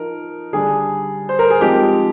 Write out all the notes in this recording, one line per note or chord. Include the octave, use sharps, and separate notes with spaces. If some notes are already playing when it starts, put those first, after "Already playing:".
Already playing: F3 D#4 A#4
D3 G3 D4 G#4
C5
A#4
G#4
F3 G#3 C4 D#4 G4